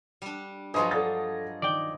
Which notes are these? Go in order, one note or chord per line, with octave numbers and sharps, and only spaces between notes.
G3 D4
G2 F3 F#3 G#4 B4 C#5 D#5 C6
A4 D5 A6
D#3 D5 G5